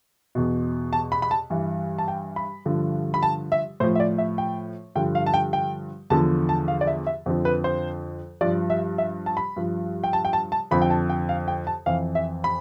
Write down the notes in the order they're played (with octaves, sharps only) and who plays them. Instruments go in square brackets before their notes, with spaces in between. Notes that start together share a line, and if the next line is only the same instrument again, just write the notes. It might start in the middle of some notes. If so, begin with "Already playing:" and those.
[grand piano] E2 B2
A5
B5
B5
A5
G2 E3
A5
G5
B5
G2 D3 F3
B5
A5
E5
A2 C5
F3
E5
D5
E5
G5
G2 D3 F3 G5
F5
A5
G5
G5
E2 D3 F3 A5
A5
F5
D5
E5
E5
F2 D3 F3
B4
C5
G2 F3 D5
E5
E5
A5
B5
G2 F3
G5
A5
G5
A5
A5
F2 D3 F3 B5
G5
A5
G5
F5
G5
A5
F2 E3 F5
E5
B5